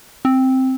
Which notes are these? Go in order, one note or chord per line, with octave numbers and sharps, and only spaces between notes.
C4